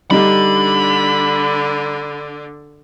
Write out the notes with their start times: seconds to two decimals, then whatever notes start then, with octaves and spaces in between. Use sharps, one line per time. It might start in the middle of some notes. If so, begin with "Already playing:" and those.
0.11 D3 G3 D4 D#4 B5